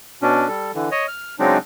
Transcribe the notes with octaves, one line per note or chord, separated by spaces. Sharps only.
B2 C#4 D4
G3 A4
D3 E3
C#5 D#5
F6
C#3 F#3 G#3 C4 D4 D#4